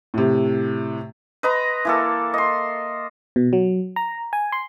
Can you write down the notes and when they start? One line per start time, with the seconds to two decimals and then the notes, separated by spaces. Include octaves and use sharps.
0.14 A2 C3
1.43 B4 D#5 A#5 C6
1.85 E3 A#3 A4
2.34 D#5 C6
3.36 B2
3.53 F#3
3.96 A#5
4.33 G#5
4.52 C6